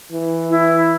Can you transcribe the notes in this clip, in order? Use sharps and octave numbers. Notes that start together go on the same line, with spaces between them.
E3
E4